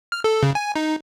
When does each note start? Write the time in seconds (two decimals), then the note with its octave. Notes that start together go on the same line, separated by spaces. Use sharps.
0.12 F6
0.24 A4
0.43 C#3
0.55 G#5
0.76 D#4